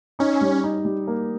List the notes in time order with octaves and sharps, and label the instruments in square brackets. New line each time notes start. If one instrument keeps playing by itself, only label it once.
[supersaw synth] C#4 [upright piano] D#4
[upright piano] G3
D#4
G3
A#3